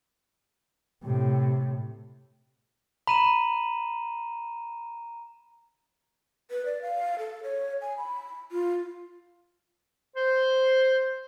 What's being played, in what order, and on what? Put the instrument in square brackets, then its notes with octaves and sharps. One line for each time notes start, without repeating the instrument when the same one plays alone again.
[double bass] A2 C3
[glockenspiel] A#5 D#7 E7 [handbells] B5
[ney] B4
D5
F5
A4
C#5
G#5
B5
F4
[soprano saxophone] C5